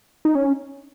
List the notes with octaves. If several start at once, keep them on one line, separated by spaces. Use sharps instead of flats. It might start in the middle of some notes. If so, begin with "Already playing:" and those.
D#4
C#4